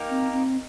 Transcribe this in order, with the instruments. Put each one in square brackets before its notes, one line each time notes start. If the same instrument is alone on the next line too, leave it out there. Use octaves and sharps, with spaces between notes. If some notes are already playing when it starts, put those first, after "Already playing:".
Already playing: [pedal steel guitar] A#3 D#4 G4 A#4
[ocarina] C4
C4